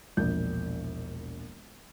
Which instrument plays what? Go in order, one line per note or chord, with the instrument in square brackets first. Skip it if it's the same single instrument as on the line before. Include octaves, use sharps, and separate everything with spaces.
[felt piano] E1 A#1 G6